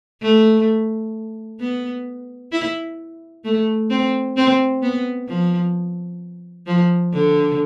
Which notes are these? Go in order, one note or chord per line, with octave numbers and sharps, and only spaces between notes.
A3
B3
E4
A3
C4
C4
B3
F3
F3
D3